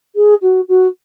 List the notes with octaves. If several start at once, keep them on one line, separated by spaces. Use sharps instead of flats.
G#4
F#4
F#4